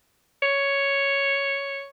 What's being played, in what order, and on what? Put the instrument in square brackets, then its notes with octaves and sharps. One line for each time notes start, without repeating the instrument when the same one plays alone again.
[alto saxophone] C#5